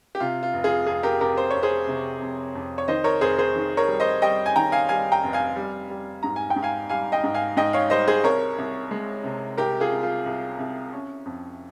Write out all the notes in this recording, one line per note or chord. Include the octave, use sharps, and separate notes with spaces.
G4
C3 F4
F4
F1
F4 G#4
F2 F4 G#4
G4 A#4
F1 G4 A#4
C5
F1 C#5
G#4 C5
C3
F2
F2
C#5
D#3 C5 D#5
A#4 C#5
F1 G#4 C5
G#4 C5
D#3
A#4 C#5
G3
C5 D#5
G3 D#5 G5
G#5
D#3 G5 A#5
F5 G#5
G3 F5 G#5
G5 A#5
F1
F5 G#5
G3
G3
G#2 A#5
G#5
G5
G#2
F5 G#5
G3 F5 G#5
D#5 G5
G#2
F5 G#5
G#2 D#5 G5
C#5 F5
G3 C5 D#5
G#4 C5
C2 A#4 C#5
C2
G#3
C3
C2 G4 A#4
F4 G#4
C2
F4
C2
C2
C#4
F2